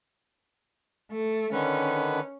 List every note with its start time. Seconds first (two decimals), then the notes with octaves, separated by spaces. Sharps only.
1.11 A3
1.53 D3 D#3 C#4 B4